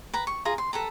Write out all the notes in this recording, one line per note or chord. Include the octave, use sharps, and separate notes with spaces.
B4 A#5
C#6
F4 G#4 A#5
C6
A4 B4 A#5